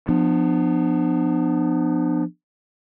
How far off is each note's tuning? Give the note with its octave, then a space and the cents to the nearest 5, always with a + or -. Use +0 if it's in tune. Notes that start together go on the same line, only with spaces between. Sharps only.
F3 +0 B3 +10 D4 +40